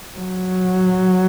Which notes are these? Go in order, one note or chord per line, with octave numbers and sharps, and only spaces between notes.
F#3